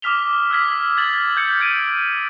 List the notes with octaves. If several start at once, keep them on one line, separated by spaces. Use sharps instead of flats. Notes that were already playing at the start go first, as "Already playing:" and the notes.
D6 D#6 F6 B6 F7 G7
E6 F6 G#6 B6
G#6 A6 F#7
G6 G#6 C#7
G6 G#6 D7 D#7